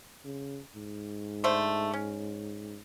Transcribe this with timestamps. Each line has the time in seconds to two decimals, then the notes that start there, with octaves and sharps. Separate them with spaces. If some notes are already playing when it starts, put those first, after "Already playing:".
0.25 C#3
0.76 G#2
1.44 D3 A3 C5
1.94 C#4